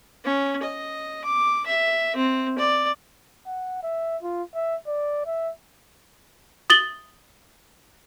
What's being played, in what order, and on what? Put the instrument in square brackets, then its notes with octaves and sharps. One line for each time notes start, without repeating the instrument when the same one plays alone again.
[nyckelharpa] C#4
D#5
D6
E5
C4
D5
[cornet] F#5
E5
F4
E5
D5
E5
[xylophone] D#6 A6 F#7 G7